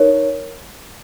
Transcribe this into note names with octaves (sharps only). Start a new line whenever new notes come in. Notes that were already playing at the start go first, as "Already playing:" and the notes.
Already playing: D#4 A#4 C#5